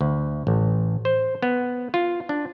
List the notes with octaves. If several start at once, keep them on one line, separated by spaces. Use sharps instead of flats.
D2
A1
C5
B3
F4
D4